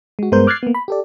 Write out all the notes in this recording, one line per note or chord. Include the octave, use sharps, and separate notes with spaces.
G#3 F#4
G2 G#3 B3 A#4 C5 G6
D6 F6 F#6 G#6 A6 C7
A#3 B3
B5
G4 A4 D5